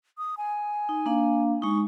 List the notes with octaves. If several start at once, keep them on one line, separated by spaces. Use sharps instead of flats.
D#6
G#5
D#4
A#3 D4 F5
G#3 D#4 C#6